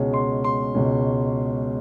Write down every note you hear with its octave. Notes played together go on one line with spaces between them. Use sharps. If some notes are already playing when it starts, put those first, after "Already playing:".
Already playing: C#2 B2 G#3 C#4
C6
C6
C#2 B2 G#3 C#4